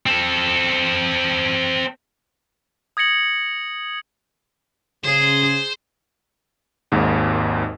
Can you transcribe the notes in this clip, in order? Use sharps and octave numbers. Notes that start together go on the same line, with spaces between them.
C4 A4
D#6 G#6 A#6 C#7 F#7
C#3 G#4 C5
G#1 D#2 G#2